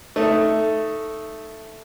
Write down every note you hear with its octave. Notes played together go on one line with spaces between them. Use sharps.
A3 D#4